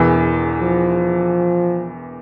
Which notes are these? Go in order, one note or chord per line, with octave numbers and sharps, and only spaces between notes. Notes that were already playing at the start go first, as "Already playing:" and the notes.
Already playing: E1 E2 E3
F3